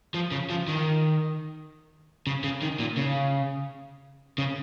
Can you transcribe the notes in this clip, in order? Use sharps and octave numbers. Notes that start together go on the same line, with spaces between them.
F3
C#3
F3
D#3
C#3
C#3
D#3
A#2
C#3
C#3